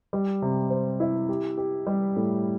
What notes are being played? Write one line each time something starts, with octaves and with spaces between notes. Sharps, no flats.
G3
C3
C5
E4
G4
G4
G3
A2